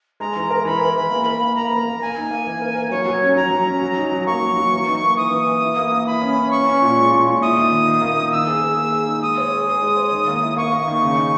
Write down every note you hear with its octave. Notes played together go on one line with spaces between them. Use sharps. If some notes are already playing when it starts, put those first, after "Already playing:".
G#3 A#5
E3
A#4
E3 B5
A#4
E3
A#3
A#4
A#3
A#3 A#5
A#4
A#3
A#3 G#5
D#4
A#3
E3
A#4
A#4
F#3 C#5
F#3
C#4
F#3 A#5
F#3
C#4
F#3
D#4
F#3
A#3 C#6
F#3
F#3
E3
D#4
A#3
E3 D#6
E3
E3
E4
A#3
A#3
E4 B5
C#4
C#4
C#4 C#6
C#4
A#2
G#3
A#2
A#2
E4 D#6
D#3
D#3
D#3
A#3
D#3
D#4 E6
G#4
G#4
A#3
G#4
D#4
G#3 D#6
C#5
G#4
G#4
G#3
C#5
D#3
A#3
E4
A#3 C#6
A#3
D#3
C#3
D#4